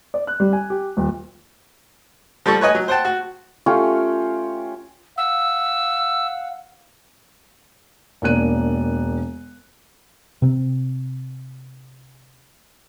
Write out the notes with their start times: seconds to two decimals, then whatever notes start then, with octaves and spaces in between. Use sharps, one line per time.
0.14 D5
0.27 F#6
0.40 G3
0.53 G#5
0.70 G4
0.97 D#1
2.46 F3 G3 A4 C#6
2.61 B4 C#5 D#5 G#5
2.75 F#3
2.88 C5 F#5 G5 A5
3.05 F#4
3.66 A3 C#4 F4 G4
5.18 F5 F#5 E6
8.22 E1 A#3 D4 F#6 D#7
10.42 C3 C4